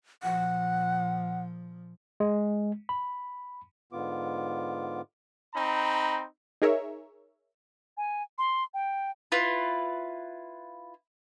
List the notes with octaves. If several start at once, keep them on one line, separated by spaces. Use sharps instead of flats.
A#2 F3 F#5
G#3
B5
G#2 D3 B3 F4 D6
C4 D#4 A#5 B5
D#4 G#4 A#4 C#5 E5
G#5
C6
G5
E4 F4 B4